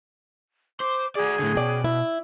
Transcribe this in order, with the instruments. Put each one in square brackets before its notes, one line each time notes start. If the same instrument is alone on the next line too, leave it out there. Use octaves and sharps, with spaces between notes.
[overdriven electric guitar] C5 [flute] D6
[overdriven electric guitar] F#4 D5 [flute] G#4
[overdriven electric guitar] A2 D3
[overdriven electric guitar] B2 [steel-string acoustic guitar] C#4 D5 G5
[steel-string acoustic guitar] E4